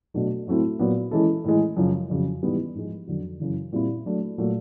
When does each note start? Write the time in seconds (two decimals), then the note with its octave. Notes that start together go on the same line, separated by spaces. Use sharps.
0.14 B2 F#3 A3 D4
0.47 A2 F#3 A3 C4 E4
0.79 A#2 F#3 B3
1.11 E3 G#3 C#4 E4 A4
1.44 A2 E3 G#3
1.77 F#2 C#3 F3
2.10 F2 C#3 F#3
2.43 G#2 E3 G3 B3
2.75 G#2 F3 G#3
3.07 F2 D3 F#3
3.40 F#2 C#3 E3
3.73 A#2 G3 C4 E4
4.06 F#3 A3 D4
4.38 A#2 F#3 A3